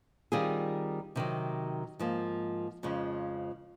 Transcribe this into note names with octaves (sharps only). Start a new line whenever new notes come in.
D#3 G3 C4 F4 G#4
C3 D#3 F#3
G#2 F3 A#3
F2 C#3 F3 G#3